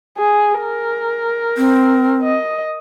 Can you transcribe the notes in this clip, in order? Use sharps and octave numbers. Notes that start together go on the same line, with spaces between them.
G#4
A#4
C4
D#5